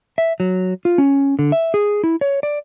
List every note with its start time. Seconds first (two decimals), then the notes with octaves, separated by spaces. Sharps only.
0.18 E5
0.40 F#3
0.85 F4
0.98 C#4
1.39 D3
1.52 E5
1.74 G#4
2.04 E4
2.21 C#5
2.43 D5